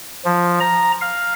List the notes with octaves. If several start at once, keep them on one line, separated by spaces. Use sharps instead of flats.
F3
A#5
F5